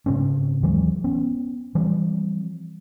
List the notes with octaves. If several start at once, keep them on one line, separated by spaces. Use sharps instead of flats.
G#2 C#3 C4 C#4
D#2 E3 F#3 G#3
B3 C#4
E3 F3 G3 C4